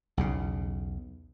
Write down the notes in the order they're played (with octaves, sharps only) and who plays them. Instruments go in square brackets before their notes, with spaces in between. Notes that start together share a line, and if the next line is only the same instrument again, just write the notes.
[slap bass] B1 E2 C#3